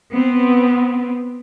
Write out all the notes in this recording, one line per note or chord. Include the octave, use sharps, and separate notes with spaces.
B3 C4